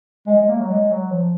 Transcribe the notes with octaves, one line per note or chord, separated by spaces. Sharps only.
G#3
G#3
A#3
F#3
G#3
F#3
F3